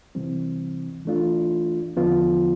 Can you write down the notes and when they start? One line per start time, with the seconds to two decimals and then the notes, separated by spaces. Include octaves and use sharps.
0.15 C3 E3 G3 C4
1.05 E3 A3 D4 F4
1.97 E2 D3 F3 B3 F4